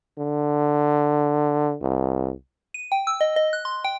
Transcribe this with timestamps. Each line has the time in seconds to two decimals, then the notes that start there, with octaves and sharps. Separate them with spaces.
0.18 D3
1.82 C2
2.74 D#7
2.92 G5
3.07 E6
3.21 D#5
3.36 D#5
3.53 F#6
3.65 C6
3.84 G5